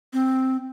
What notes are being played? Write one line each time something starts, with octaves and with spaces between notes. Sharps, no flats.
C4